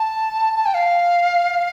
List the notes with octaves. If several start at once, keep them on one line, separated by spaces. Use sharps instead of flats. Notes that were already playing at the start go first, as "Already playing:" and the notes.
Already playing: A5
A5
G5
F5